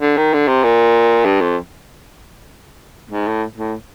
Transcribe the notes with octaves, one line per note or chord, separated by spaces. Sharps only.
D3
D#3
D3
C3
A#2
G2
F2
G#2
A2
A2